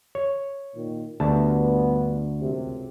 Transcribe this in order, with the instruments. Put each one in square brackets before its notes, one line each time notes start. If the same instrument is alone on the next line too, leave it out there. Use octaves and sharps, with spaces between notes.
[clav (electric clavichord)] C#5
[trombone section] A#2 D#3
[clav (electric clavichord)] D2 A5 [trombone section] G2 B3
[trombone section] C#2 F#2 C3